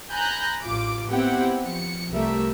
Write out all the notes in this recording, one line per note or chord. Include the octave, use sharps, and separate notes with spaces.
G#5 A#5 B5 F#6 G6 A#6
A1 F4 D6
B3 C4 E4 G4 F#5 G5
F3 C#7
C2 F3 G3 A3 A#4 E5